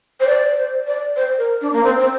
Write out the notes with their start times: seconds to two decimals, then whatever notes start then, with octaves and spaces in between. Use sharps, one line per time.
0.20 C5
0.27 D5
0.56 C5
0.87 D5
1.16 C5
1.38 A#4
1.61 D4
1.73 A#3
1.83 C4
2.00 C4